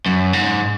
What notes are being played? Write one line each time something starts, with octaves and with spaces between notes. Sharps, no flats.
F#2
G#2